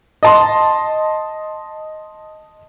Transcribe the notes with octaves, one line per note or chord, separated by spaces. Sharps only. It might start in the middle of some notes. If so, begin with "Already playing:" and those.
D#5 A5 C6